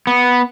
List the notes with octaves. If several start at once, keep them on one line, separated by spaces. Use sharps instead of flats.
B3